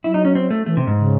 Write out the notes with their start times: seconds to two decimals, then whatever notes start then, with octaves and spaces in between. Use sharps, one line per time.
0.04 F#3 E4
0.14 D#4
0.25 C#4
0.35 C4
0.51 A3
0.66 E3 A3
0.77 C3
0.87 G#2
0.97 C#3